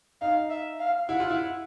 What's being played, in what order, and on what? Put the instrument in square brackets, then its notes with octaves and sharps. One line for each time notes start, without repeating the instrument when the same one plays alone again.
[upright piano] D#4 [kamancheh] F5
[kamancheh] E5
F5
[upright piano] E4 [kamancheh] F#5
[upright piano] F4
E4